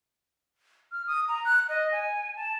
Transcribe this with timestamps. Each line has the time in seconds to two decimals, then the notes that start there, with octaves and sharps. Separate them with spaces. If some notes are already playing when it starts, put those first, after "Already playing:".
0.92 F6
1.07 D#6
1.28 A#5
1.45 F#6
1.69 D#5
1.92 G#5
2.36 A5